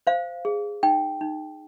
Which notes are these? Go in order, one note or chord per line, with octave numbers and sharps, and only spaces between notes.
C5 F5
G#4
D#4 G5
D#4